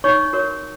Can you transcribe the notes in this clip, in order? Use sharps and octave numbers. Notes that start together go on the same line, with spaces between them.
D#4 C#5 C#6
F#4 A#4 C#5